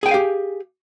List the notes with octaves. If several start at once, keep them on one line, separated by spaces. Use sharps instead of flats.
G4 G#4 F5 G5 G#5